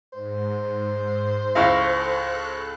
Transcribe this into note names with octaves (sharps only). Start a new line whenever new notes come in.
G#2 C5
C#2 E4 A4 F5 C#6 F6 F#6 A#6